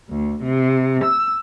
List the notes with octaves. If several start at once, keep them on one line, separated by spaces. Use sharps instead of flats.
D2
C3
E6